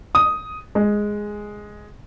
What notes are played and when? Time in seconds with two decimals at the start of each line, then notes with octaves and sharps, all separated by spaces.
0.15 D#6
0.75 G#3